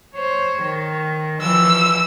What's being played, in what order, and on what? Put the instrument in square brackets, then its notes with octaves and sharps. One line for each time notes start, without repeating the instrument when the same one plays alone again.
[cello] C5 C#5
D#3
[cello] E3 F3 [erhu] E6